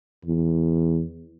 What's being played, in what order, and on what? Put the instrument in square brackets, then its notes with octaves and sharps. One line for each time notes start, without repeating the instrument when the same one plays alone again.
[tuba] E2